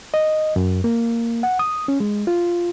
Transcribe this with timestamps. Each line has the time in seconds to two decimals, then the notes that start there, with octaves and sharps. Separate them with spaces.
0.14 D#5
0.56 F#2
0.84 A#3
1.43 F#5
1.59 D#6
1.88 C#4
2.00 G#3
2.27 F4